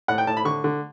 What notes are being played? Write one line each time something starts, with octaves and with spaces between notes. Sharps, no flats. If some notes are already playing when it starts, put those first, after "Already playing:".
A2 F#5
G5
A2 A5
B5
D3 C#6
D3